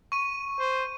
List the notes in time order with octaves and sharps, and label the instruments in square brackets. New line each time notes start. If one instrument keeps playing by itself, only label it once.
[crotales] C#6 D#7
[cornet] C5